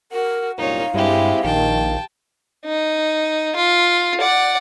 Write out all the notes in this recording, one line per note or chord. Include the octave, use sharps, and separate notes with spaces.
F#4 A#4
C2 F#2 A#2 D#4 C#5 F5
G2 G#3 C4 E4 G4
A#1 D#3 G5 A5
D#4
F4
D5 F#5